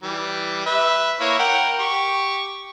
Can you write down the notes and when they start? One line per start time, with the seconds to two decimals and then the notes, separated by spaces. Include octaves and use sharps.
0.03 E3 G3
0.66 B4 E5
1.20 A#3 E4 C#5
1.39 A#4 F#5 G5
1.80 G4 C#6